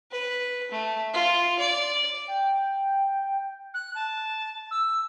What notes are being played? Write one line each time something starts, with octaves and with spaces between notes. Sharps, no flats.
B4
A3
F4
D5
G5
F#6
A5
E6